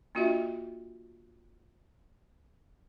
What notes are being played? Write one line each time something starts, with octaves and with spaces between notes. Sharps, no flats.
A#3 D4 F4 F#4 D#5 E5